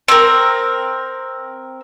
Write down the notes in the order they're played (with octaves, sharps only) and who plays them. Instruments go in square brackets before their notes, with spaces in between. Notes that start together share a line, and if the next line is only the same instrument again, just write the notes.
[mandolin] C4 A#4